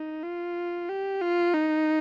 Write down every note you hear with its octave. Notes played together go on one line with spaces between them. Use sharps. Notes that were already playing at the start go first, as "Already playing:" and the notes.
Already playing: D#4
F4
G4
F4
D#4